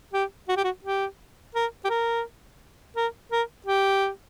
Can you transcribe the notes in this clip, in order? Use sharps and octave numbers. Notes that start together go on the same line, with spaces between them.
G4
F#4
G4
F#4
G4
A#4
G4
A#4
A#4
A#4
G4